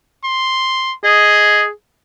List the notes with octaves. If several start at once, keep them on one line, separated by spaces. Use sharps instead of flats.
C6
G#4 D#5